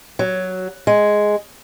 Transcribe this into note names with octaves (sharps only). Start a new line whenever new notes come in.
F#3
G#3